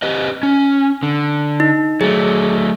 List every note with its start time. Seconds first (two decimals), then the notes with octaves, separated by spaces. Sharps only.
0.02 G4 B4 D#5
0.43 C#4
1.03 D3
1.60 D#4
2.01 F#3 A3 G#4